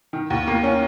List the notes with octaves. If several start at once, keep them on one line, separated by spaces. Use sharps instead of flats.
D#3
D#2
A#3
C#4